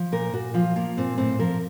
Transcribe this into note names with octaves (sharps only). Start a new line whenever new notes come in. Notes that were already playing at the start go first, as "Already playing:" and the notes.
Already playing: F3
A#2 A#4
A#2 F#4
F3 F4
F3 A#3
A#2 C4
A2 C4
F3 A#4